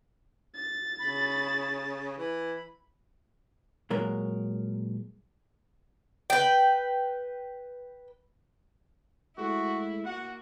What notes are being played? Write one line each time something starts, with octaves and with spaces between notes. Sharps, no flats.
A6
C#3 B5
E3 B5
A#2 F#3 G#3 A#4
B4 G5
G#3 A3 E4 F#4
A#3 F#4 F#5